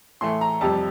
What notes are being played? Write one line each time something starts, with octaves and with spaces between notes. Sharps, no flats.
A2 E3 A3 C6
A#5
F2 C3 G3 A5